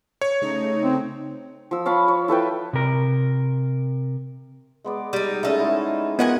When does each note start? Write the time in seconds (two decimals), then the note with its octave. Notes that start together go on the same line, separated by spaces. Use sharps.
0.21 C#5
0.42 C#3 A3 D#4
0.83 C4
1.71 F3 E6
1.86 C#5 F5 A5 B5
2.08 C#5
2.28 E4 A4 B4 G5
2.73 C3 A#4
4.84 G#3 B3 D5
5.13 G3 D#4
5.43 A3 C#4 D#4 G#4 A4
5.58 G#3 E4 G#4
6.19 B3 F4 A#4 D#5 F#5 G#5